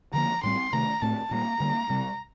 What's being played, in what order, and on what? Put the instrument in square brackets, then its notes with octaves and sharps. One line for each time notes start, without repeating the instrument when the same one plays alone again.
[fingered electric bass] D3 F3 A#3 [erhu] A#5
[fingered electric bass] A2 G3 C4 [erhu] C6
[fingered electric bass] C3 D#3 A3 [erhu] A#5
[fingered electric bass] A2 A3 C4 [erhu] A5
[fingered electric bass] A#2 G3 A#3 [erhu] A#5
[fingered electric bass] D3 G3 A#3
C3 G3 C4